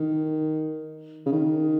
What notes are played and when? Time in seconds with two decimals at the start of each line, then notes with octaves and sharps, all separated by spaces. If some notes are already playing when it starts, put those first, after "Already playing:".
Already playing: D#3
1.26 C#3
1.32 D#3